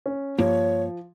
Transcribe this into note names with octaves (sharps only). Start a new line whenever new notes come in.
C#4
G2 F3 A#3 C#5